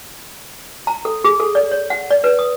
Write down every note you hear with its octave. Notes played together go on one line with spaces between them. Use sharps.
A#5
A4
G#4
A4
D5
C#5
F#5
D5
B4
D#6